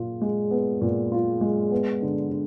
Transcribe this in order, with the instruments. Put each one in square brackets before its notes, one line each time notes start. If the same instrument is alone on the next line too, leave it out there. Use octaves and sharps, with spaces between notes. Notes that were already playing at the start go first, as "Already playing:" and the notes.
Already playing: [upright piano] A#2 F4
G#3
B3
A#2
F4
G#3
B3
D3
D3